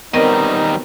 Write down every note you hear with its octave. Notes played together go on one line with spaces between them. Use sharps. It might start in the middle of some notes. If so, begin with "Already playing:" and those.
D#3 G3 B3 C4 D#4 A#4 D#5